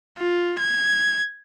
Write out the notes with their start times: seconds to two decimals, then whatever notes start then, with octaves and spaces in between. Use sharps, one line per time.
0.18 F4
0.59 G#6